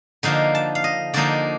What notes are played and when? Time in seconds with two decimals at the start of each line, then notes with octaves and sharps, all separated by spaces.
0.23 D3 F3 A#3 D#4 F5
0.55 A5
0.75 F5
0.84 D#5
1.14 D3 F3 A#3 D#4 D5